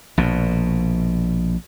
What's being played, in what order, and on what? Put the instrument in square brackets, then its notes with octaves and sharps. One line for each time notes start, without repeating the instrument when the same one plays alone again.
[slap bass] A#1 B2